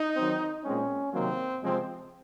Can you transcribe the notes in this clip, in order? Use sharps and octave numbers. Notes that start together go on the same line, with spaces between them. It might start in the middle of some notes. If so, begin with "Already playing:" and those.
Already playing: D#4
D#3 F#3 C4
A#2 G#3 C4 C#4
C3 D#3 F#3 A#3 C4
C3 F3 G#3 C4